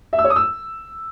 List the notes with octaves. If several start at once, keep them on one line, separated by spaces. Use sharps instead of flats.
E5
E6
C#5
D#6
E6